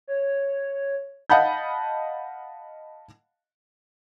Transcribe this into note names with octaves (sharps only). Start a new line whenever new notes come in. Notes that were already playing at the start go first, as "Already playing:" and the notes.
C#5
D#5 F5 F#5 A5 B5 G6